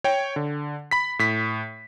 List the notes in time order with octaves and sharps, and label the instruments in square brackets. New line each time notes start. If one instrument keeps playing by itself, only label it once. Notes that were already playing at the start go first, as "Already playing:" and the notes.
[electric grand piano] C#5 G5
D3
B5 B6
A2 B6